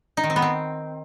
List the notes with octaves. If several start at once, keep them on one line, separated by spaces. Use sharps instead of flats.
D#4
D#3
C4
B3
C4